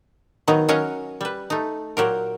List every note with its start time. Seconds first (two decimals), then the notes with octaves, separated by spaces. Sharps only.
0.48 D#3 F#3 B3 D#4
0.68 F#3 C#4 A#4 C#5 D#5 F5
1.21 G3 B4
1.50 A3 D#4
1.97 A#2 F#3 G4 A#4